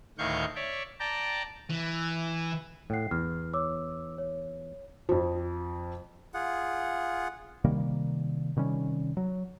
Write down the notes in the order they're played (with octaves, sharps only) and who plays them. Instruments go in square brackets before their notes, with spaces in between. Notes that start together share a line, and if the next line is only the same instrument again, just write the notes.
[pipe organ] D2 A2 D#3 F5 C#6 G6
C#5 D5 E5
D5 G5 A5 A#5
[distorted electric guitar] E3
[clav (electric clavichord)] A2 F#5 [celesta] G5 C7
[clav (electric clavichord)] E2 [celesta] F6
[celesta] C#5 D6 E6
C#5
[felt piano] F2 F3
[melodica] F4 G#4 F#5
[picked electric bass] C3 D#3 G3 A#3
C3 D#3 G3 C#4
F#3